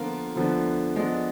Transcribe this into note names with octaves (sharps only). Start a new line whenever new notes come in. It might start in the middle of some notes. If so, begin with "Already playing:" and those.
Already playing: D3 F3 A#3 B3 F4 A#4
D2 D3 F3 B3 D4
F3 G#3 B3 D4